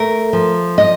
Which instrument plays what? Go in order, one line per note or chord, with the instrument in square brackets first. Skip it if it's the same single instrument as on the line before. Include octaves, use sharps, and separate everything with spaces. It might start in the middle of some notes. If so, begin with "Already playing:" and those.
Already playing: [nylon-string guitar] A3 A#4
F3
D#5